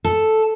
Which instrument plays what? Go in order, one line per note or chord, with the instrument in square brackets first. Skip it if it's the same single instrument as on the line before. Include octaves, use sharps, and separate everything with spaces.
[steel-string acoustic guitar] A4